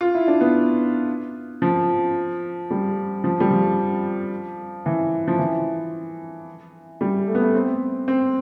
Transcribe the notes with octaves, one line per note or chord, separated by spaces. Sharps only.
F4
E4
D4
B3
F3
G3
F3
G3
F3
E3
F3
E3
G3
A3
B3
A3
C4
C4